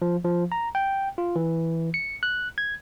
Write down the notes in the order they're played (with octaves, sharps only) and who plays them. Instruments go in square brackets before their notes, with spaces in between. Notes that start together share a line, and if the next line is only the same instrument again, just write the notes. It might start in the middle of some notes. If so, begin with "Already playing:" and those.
[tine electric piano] F3
F3
A#5
G5
F4
E3
C#7
F#6
G#6